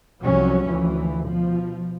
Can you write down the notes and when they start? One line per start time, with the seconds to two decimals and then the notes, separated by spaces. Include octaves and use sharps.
0.23 C2 F3 F#3 C#4
0.67 D2 E3 F3
1.25 B2 F3